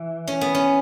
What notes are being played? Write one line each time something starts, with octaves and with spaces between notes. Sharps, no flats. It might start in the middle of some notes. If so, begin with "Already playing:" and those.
Already playing: E3
C#4
B3
C#4